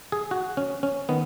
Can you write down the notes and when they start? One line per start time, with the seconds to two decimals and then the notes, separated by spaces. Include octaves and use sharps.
0.12 G#4
0.31 F#4
0.57 C#4
0.83 C#4
1.09 D#3 B3